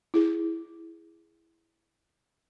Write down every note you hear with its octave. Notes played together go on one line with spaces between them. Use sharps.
E4 G#4